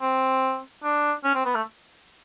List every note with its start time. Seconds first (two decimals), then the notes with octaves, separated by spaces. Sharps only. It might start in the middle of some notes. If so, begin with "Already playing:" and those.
0.01 C4
0.84 D4
1.24 C#4
1.35 C4
1.45 B3
1.55 A3